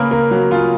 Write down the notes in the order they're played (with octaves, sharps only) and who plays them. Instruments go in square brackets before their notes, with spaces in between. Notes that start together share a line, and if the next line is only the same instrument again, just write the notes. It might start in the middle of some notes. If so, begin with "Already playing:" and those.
Already playing: [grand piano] C#3 A#3 A#4 B4
C#3 A#4
F#3
C#3 F4